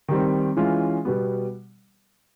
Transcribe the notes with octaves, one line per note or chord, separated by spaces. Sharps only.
D#3 G3 C4
E3 G#3 C#4 F4
B2 G3 B3